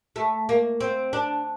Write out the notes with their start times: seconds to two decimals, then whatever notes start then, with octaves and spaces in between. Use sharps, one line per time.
0.16 A3
0.49 A#3
0.80 C4
1.13 D4